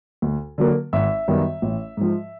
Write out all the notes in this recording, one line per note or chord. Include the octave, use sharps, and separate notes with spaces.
D2
D3 F#3 A#3
G#1 E5
F#2 D#3 G3 B3
A1
G#2 F3